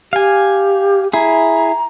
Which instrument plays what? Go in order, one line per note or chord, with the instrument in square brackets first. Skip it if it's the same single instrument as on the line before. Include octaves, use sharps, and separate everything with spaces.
[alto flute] G4 [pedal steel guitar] F5 G#5
[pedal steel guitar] E4 G#4 [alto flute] A#5